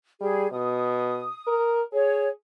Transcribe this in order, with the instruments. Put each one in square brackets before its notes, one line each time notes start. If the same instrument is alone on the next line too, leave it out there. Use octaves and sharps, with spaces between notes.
[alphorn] G3 [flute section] G#4
[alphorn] B2 [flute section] D#6
[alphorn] A#4
[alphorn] G#4 [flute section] C#5